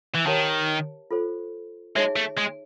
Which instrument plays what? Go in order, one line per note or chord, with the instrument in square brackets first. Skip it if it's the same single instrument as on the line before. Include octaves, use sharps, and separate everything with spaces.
[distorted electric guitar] E3
[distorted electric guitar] D#3 [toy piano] G4 A#4 C#5 F5 A5
[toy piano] F4 A4 C5
[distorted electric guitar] G#3 [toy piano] D#4 G#4 C#5 E5
[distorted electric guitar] A3
G#3